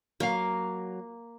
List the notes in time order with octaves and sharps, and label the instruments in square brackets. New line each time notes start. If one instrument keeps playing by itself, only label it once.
[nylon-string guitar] F#3 F#4 F5 [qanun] A#3